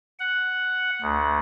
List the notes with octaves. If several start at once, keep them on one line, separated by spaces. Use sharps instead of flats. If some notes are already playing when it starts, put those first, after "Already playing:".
F#5
D2